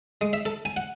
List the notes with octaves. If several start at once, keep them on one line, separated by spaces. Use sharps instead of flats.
G#3
E5
A4
G#5
F#5